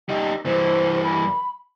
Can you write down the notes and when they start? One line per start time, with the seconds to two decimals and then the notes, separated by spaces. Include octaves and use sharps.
0.09 G3 D#4 G5
0.46 G2 E3 C5
1.04 B5